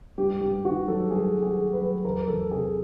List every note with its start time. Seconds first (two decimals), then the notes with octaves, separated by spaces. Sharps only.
0.18 G2 G4
0.40 G2 G4
0.64 D#3 F#4
0.88 F#3 A4
1.10 G2 G#4
1.35 G2
1.42 G#4
1.57 D#3
1.73 B4
1.81 F#3
2.04 E2 A#4
2.27 E2 A4
2.51 C3 G#4